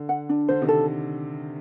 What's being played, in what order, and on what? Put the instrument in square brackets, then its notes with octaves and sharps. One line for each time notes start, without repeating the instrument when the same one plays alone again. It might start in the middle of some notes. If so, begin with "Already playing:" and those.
Already playing: [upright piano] D3
[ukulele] F#5
D4
[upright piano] D3 [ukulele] C5
[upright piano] C3 D#3
[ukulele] A4